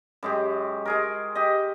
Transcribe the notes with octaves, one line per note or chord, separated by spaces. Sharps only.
F#2 G#3 G4
G#3 G#4 A#4
G4 D#5